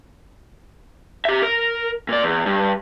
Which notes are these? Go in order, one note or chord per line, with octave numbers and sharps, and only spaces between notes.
G4 E5
A#4
A#2 D5
E2
G2